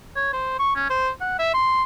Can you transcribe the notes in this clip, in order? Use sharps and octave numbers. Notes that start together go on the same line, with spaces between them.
C#5
C5
C#6
C#4
C5
F#5
E5
C6